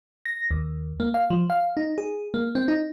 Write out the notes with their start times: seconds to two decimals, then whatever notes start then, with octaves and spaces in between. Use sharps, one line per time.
0.25 A#6
0.51 D#2
1.00 A#3
1.14 F5
1.30 F3
1.50 F5
1.77 D#4
1.98 G#4
2.34 A#3
2.55 C4
2.68 D#4